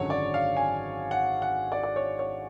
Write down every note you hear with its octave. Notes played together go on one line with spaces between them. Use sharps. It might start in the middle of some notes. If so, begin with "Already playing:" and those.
Already playing: G#1 F#2 D3 F#3 C#5
D5
F5
G#5
F#5
F#5
D5
D5
C#5
C#5